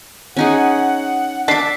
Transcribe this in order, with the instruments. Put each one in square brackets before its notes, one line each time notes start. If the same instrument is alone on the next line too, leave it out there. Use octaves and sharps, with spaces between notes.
[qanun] C#4 D#4 G#4 [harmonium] F#5
[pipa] D4 A5 [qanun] E5 D6 [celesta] B6 C7